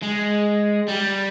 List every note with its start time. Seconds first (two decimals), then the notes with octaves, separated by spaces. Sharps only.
0.02 G#3
0.88 G3